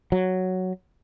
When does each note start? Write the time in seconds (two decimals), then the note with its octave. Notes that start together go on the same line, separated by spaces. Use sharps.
0.12 F#3